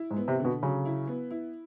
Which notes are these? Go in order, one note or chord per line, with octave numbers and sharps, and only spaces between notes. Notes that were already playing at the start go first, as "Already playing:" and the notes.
Already playing: E4
G#2
B3
C3
B2 D3
C#3 F#3
E4
B3
E4